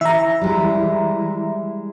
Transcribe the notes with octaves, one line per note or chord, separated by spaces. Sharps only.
E3 E5 A#5
G3 G#3 E4